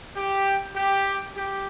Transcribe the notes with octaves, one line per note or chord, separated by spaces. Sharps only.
G4
G4
G4